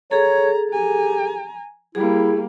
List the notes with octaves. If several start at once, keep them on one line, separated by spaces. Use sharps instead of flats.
G#4 A4 C#5 A#5
G4 G#5 A#5
G3 A#3 E4 G#4